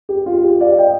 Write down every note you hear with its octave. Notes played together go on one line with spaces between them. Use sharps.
G4
F4
G4
D5 F5
D#5 G5